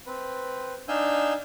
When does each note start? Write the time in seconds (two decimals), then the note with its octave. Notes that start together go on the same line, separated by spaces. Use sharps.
0.07 C4 B4
0.88 D4 D#4 F5 G#5 E6 G6